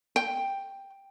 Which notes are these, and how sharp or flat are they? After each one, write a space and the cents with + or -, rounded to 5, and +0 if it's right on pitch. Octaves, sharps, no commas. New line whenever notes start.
G5 +5